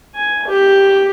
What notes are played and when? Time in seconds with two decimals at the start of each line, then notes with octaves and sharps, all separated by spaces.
0.15 G#5
0.47 G4